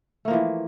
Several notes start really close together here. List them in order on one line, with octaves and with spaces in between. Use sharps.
A3 A#3 F3 E3